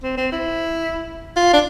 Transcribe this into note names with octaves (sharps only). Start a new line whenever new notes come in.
C4
C4
E4
F4
D4